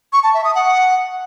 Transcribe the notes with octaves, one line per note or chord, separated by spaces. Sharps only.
C#6
A5
E5
D#6
F#5